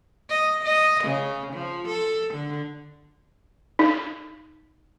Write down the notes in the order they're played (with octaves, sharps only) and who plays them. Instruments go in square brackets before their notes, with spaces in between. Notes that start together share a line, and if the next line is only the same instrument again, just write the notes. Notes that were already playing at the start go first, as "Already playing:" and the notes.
[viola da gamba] D#5
D#5
C#3
F3
A4
D3
[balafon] D#4